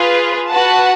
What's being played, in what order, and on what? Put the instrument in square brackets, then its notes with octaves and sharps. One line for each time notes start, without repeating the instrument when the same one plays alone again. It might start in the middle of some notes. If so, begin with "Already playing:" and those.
Already playing: [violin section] F4 G#4 B4
F#4 B4 F#5 A5